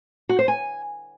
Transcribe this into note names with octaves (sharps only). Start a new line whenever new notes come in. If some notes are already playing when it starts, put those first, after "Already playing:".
F#4
C5
G#5